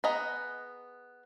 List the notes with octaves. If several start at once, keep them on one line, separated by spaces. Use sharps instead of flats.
B3 G#4 D#5 A#5